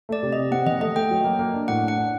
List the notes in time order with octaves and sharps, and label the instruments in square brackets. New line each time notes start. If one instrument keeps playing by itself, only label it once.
[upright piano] A3 [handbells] D5
[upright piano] C3
[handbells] D#5
[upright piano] C3
[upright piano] C4 [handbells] F#5
[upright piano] D#3 [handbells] D#5
[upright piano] A3 [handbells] D#5
[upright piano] A3 [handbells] G5
[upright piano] F#3
A#3
A#3
D4
[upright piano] A2 [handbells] F#5
[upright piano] D4
[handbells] F#5
[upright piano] D4